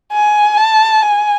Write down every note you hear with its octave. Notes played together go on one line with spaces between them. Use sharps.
G#5
A5
G#5